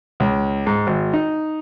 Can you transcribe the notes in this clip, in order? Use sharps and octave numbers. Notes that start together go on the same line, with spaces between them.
C#2
G#2
G#1
D#4